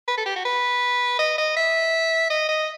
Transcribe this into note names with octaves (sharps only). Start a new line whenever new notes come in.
B4
A4
G4
F#4
B4
D#5
D#5
E5
D#5
D#5